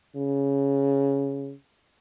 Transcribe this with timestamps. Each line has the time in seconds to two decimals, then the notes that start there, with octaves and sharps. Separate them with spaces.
0.16 C#3